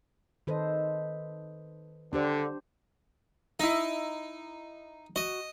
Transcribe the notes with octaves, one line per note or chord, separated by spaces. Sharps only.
D#3 A4 B4 C5 D#5
D3 D4 G4 C5
D#4 E4 D#5
F#4 D#5